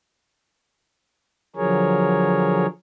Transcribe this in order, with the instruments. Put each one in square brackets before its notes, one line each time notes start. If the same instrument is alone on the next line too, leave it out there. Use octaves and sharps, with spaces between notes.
[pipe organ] D3 F3 F#3 G#4 A#4 C#5